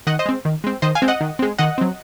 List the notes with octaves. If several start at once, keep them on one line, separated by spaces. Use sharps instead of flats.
D#3 D#5 F#5
C5 D#5
G#3 C4
D#3
G#3 C4
D#3 C5 D#5
F5 G#5
G#3 C4
D#5 F#5
D#3
G#3 C4
D#3 D#5 F#5
F#3 C4